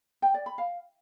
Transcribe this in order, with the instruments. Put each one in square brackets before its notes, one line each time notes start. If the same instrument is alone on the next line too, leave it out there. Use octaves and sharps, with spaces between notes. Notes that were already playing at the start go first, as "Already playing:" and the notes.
[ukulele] G5
D5
B5
F5